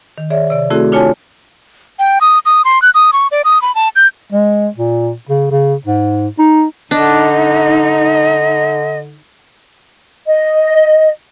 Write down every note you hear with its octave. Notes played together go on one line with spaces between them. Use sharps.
D#3
G#4 C#5 D5 E5
C3 D5
A3 C4 E4 F#4 G#4 A4
D4 E4 F4 C#5 G#5 A5
G5
D#6
D#6
C6
F#6
D#6
C#6
D5
D#6
B5
A5
G6
G#3
A#2
C#3
C#3
G#2
D#4
D3 D4 D#4 D#5
D#5